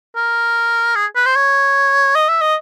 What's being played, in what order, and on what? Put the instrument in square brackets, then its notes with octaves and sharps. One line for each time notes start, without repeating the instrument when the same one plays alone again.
[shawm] A#4
G#4
B4
C5
C#5
D#5
E5
D#5